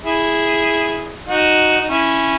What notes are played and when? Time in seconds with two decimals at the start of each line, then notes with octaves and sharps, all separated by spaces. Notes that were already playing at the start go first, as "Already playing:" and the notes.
0.05 E4 G#4
1.28 D#4 F#4
1.80 D#4
1.89 C#4 E4